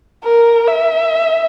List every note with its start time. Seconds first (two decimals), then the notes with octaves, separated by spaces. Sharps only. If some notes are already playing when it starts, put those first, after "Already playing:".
0.24 A#4
0.68 E5